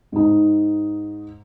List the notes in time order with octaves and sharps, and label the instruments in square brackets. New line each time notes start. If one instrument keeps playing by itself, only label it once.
[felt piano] G#2 D#4